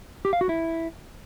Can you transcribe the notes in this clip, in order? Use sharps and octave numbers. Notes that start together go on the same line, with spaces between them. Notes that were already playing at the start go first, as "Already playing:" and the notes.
G4
F5
F#4
E4